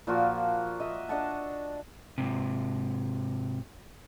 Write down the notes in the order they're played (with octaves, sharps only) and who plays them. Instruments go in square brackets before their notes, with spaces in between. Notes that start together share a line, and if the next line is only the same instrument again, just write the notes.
[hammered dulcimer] A#2 F3 A#3 F#4
D#5 E5
D4 D#5 F#5 A5
[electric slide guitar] G#2 C3